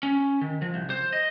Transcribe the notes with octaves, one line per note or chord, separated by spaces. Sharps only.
C#4
D#3
F3
C2
C5
D#5